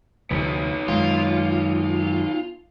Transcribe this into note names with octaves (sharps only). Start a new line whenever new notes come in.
D2 C3 F3 B3 D#4
F#2 D#3 G#3 F4